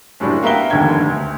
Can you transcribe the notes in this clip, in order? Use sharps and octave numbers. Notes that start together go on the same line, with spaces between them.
F#1 A2 G3 D4
A#3 B3 A#4 E5 G5 G7
F1 D#2 G#2 D3 G5 G#6
D2